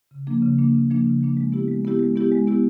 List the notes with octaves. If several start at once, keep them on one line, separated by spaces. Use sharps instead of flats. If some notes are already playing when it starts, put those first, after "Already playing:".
C#3
F3 A#3 D4
C#3
F3 A#3 D4
C#3
F3 A#3 D4
C#3
F3 A#3 D4
G#3
B3 E4 G4
G#3
B3 E4 G4
G#3
B3 E4 G4
G#3
B3 E4 G4